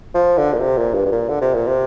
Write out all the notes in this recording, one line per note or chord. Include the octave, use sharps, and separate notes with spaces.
F3
D3
A#2
C3
A#2
G2
G2
A#2
D3
C3
A#2
C3